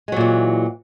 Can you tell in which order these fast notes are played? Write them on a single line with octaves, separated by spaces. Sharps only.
G#3 F#3 A#2 E3